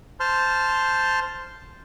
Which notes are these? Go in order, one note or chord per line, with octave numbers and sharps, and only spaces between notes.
C5 A5 C6 F6